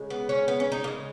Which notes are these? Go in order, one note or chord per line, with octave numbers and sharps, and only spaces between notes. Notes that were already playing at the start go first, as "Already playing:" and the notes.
Already playing: C#3 G#3
B3
C#4
B3
C#4
D#4
C#3 G#3 A#3